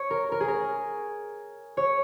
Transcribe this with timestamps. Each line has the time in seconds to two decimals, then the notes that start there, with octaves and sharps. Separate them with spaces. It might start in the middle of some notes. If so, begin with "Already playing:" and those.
Already playing: C#5
0.10 A#4
0.32 A#4
0.40 G#4
0.48 A#4
1.77 C#5